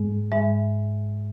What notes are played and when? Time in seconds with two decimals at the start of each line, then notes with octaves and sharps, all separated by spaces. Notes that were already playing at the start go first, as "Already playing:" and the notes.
Already playing: G#2 G#3
0.32 G#2 G#3 E5